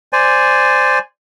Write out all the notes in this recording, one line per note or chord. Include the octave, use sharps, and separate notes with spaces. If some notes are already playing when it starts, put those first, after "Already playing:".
C5 D5 G#5